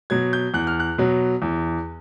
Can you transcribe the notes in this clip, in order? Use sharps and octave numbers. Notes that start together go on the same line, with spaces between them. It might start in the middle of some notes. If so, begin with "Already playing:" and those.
B2 F#3 G#6
G6
E2 F#6
F6
F#6
B2 F#3
E2